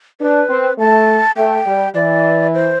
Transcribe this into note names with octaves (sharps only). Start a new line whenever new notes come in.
D4 B4
C4
A3 A5
A3 G5
G3
E3 D5
C5